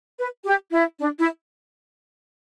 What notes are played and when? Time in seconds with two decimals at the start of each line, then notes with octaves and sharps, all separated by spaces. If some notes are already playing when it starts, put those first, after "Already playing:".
0.18 B4
0.45 G4
0.72 E4
0.99 D4
1.19 E4